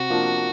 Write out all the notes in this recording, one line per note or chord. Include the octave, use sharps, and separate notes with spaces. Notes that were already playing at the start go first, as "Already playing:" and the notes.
Already playing: C3 F#4
F3 A#3 D4